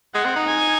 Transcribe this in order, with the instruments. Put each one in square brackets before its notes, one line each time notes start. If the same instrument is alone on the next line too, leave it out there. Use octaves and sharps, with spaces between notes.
[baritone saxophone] G#3 [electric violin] F#5
[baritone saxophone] C4
D#4
[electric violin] G#5